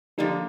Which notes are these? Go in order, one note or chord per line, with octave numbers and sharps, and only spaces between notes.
D3 D#3 F3 G3 A#3